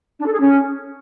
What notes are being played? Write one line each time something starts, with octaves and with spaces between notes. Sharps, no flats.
D4
A4
G#4
C#4